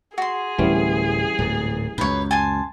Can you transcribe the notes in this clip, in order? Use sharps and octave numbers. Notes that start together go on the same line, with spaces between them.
F#4 G#4 C6
D1 E3 G3 C#4
D1 G#2
C#2 F#2 B4 C#5
G#5 A5 C6